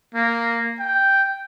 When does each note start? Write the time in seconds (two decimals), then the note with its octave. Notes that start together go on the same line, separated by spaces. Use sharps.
0.14 A#3
0.80 G5